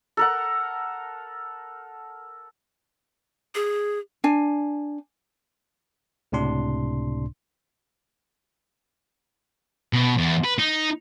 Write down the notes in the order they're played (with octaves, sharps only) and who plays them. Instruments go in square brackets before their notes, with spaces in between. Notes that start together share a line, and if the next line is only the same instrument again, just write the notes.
[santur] A4 A#4 F#5
[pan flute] G#4
[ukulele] D4 G#5
[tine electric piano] C#2 A2 C3 D4 C6
[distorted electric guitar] B2
E2
B4
D#4